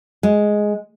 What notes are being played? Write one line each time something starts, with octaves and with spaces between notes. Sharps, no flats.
G#3